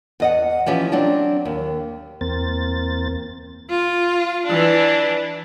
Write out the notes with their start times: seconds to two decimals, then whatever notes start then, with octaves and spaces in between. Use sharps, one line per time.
0.20 E2 D#5 F#5
0.66 E3 F3 C#4 G4
0.92 F#3 C4 D4
1.45 D#2
2.21 E2 A#3 C4 A6
3.70 F4
4.46 E3 D4